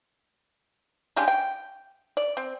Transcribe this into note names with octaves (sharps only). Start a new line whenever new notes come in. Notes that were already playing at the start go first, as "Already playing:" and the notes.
C#3 G#3 D4 G4
G5
D5
C4